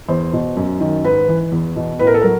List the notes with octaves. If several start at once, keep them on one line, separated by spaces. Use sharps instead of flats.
E2 C5
B2
F#2
D#3
G#2 B4
E3
E2
B2
A2 B4
A#4
A4
F#3 A#4